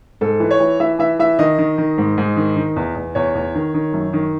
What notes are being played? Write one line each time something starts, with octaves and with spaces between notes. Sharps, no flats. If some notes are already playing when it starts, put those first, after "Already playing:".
G#2 A4
E3
C#5
E3
E3 E5
E3 E5
E3 E5
D#3 D#5
D#3
D#3
G#2
G#2
D#3
D#3
E2
E2
E2 C#5
E2
D#3
D#3
F#2
D#3